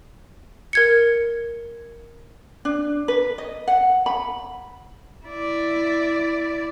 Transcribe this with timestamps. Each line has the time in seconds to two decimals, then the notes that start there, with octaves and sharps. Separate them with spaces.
0.73 A#4 G#6 C#7
2.65 D4
3.08 B4
3.38 D#5
3.68 F#5
4.06 B5
5.26 E4 D5